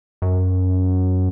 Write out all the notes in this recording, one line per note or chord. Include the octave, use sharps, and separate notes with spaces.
F#2